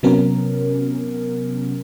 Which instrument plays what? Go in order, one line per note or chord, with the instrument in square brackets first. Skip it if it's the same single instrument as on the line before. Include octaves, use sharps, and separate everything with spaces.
[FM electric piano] C3 F#3 B3 C#4 A#4